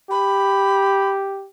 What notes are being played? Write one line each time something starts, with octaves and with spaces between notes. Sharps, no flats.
G4 B5